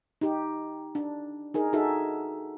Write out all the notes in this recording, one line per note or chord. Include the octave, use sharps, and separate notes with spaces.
D#4 G4
D4
D#4 G#4 A#4
D#4 F#4 G#4 A4 E5